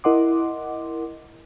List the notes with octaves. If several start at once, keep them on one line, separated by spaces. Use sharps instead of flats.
E4 A#4 D#5 F#5 C6 D6